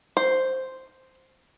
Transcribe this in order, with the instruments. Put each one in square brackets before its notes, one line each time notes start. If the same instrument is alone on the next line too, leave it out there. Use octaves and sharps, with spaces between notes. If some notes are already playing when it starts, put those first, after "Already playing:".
[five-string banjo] C5